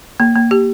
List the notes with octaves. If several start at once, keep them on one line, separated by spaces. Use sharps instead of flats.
A#3
A#3
G4